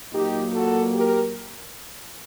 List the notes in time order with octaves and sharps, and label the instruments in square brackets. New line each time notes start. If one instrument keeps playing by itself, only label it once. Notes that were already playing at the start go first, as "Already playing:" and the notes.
[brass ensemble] A#2 F#3 A#3 D#4 G4
F#4 A4
G4 A#4